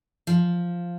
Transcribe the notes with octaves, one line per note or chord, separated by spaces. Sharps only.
F3